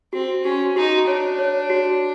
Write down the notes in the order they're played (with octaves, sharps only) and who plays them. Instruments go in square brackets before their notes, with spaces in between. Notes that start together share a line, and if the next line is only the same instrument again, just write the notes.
[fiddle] C4 [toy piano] F#4
[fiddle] C#4 [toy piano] F#4
[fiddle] D#4 [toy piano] F#4
[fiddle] D4 [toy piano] C#5
[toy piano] C#5
F#4